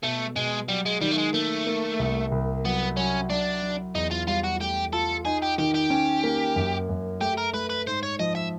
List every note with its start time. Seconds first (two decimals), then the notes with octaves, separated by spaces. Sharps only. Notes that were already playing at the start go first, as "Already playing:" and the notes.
0.03 B2 A3
0.36 B2 G#3
0.68 F#3 G3
0.86 G#3
1.01 D#3 G3
1.11 A3
1.18 G#3
1.34 A3 A#3
1.67 A#3
1.99 C2
2.32 C2
2.65 F#3 B3
2.97 F#3 C#4
3.30 F#3 D4
3.62 F#3
3.95 E2 D#4
4.11 F4
4.27 G3 F4
4.44 F#4
4.60 A3 G4
4.93 F4 A4
5.25 D#4 G#4
5.42 G4
5.58 D#3 G4
5.75 G4
5.90 C#4
6.24 A#3
6.56 F#2
6.89 F#2
7.21 A3 G4
7.38 A#4
7.54 A3 B4
7.70 B4
7.87 G#2 C5
8.03 C#5
8.19 F3 D#5
8.35 E5